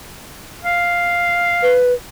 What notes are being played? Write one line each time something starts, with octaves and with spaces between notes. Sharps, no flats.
F5
B4